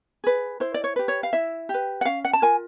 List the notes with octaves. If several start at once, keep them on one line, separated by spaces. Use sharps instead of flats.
G#4 B4
E4 C5
D5
C#5
G4 B4
C#5
F5
E4 E5
G4
B4
F#5
C#4 F5
F#5
A5
F4 A#4 G#5